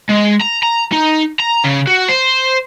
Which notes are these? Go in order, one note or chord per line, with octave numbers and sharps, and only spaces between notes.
G#3
A#5
A#5
D#4
A#5
C#3
F#4
C5